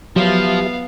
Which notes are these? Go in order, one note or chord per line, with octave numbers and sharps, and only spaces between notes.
F3 F#3 B3 G4 E5 F5